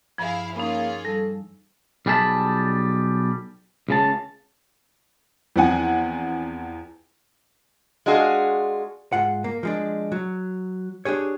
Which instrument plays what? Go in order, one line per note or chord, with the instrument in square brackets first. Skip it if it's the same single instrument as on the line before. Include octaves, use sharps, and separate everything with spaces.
[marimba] G2 F3 [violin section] E4 G#4 F5
[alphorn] A#3 [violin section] C#4 F4 G#4 [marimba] D#4 B5
[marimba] G3 [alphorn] A4
[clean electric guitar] B1 G3 G#4 F5 A5 B5
C#2 C#3 A5
[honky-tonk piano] E2 F3 C4 F#5 G#5
[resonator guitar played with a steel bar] G#3 D4 F4 F#4 G#4
[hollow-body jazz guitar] G#2 F4 F#5
A#3
F3 G#3 D4
F#3
D4 G4 G#4 C#5